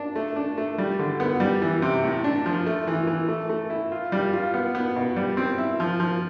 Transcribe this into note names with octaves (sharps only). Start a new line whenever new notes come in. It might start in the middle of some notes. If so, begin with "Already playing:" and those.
Already playing: D4
A3
D4
A3
G3
D3
B3
G3
E3
C3
A2
D4
F3
A3
E3
E3
A3
A3
E4
F4
G3
F4
B3
B3
B2
G3
C4
E4
F3
F3